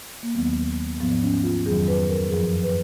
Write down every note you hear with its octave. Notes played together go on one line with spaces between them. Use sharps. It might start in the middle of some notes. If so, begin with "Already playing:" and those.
A#3
D#2 D#3 F#3 B3
G#2 F3 B3
C#4
F4
F2 D#3 F#3 G#4
B4
A#4
F#2 F3 G#4
B4